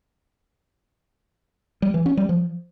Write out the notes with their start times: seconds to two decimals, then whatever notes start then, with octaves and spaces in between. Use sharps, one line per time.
1.82 G3
1.94 E3
2.06 C#4
2.17 G3
2.29 F3